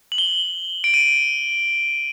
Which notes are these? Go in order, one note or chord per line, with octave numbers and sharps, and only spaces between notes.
F#7
G7
F#7
D7
D#7